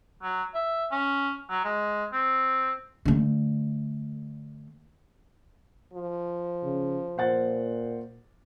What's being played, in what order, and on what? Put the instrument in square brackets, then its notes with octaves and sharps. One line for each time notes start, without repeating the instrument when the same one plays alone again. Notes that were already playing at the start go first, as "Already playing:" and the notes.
[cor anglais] F#3
E5
C#4
F#3
G#3
C4
[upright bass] D3 A3
[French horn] F3
[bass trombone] C#3
[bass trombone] A#2 [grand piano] C5 F#5 A6